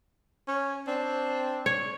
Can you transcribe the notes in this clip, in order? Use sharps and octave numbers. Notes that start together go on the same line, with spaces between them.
C#4 C#5
C4 D4
C#5